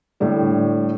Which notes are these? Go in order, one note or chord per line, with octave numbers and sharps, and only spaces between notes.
A2 D3 G3 A3